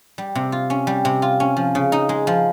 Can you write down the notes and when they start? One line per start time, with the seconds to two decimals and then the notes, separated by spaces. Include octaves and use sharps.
0.18 G3
0.35 C3
0.52 F4
0.70 C#4
0.87 G3
1.05 C3
1.22 F4
1.40 C#4
1.57 F3
1.75 C#3
1.92 D#4
2.09 G#3
2.27 F3